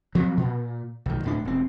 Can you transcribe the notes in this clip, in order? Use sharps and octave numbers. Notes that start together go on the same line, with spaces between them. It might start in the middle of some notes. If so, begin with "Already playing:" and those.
F3 F#3 C4
A#2
B1 D#3
D1 A2 D4
E1 C4